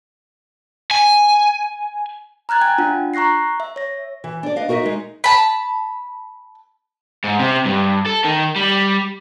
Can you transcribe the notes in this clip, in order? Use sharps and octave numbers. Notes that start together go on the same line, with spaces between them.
G#5
A#5 F6 F#6 G#6 A6
G5 G#5 G#6
D4 F4 F#5
A#5 C#6 F#6 A#6 C7
E5
C#5 A#6
E3
D4 D5
B4 D#5 F5
D#4 F#4 A#4 B4 D#5 E5
G#3 D#4
A5 B5
G#2
C3
G2
A4
D#3
G3